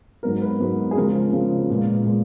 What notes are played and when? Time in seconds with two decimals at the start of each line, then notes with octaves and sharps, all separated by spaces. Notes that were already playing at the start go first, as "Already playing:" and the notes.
0.23 G#2 F#3 B3 A#4
0.42 B4
0.60 G#2 F#3 B3
0.91 G#4
0.97 C#3 F3 G#3 A#4
1.33 C#3 F3 G#3
1.70 A#2 G#3 B3
2.06 A#2 G#3 B3